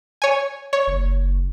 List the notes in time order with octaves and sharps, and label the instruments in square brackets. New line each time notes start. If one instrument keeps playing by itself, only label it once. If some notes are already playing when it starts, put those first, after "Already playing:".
[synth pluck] C#5 G#5
C#5
[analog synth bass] F#1